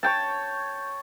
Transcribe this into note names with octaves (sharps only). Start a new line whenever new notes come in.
C#5 G5 A5